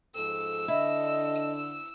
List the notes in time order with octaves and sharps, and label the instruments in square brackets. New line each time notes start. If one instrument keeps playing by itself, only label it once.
[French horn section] G#2 F3 A4 [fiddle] E6
[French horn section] D3 D4 [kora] E4 [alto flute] D#5